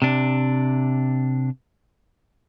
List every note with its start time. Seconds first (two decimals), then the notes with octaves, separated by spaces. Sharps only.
0.02 C3 D4